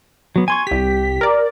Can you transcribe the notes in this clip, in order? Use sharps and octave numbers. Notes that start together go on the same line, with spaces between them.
F#3 B3
G#5 C6 C#6 G#6
C2 G4 B6
A#4 D5